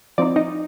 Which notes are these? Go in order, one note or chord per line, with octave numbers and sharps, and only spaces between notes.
F3 C4 D#4 D5
D#4 D#5